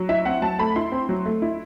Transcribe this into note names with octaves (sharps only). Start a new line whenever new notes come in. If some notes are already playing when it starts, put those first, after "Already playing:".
Already playing: F#3
E4 E5
C4 F#5
F#3 A5
A3 B5
E4 C6
C4
F#3
A3
E4